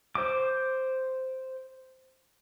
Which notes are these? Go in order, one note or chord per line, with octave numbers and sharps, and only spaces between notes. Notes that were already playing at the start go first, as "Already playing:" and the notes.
C5 D6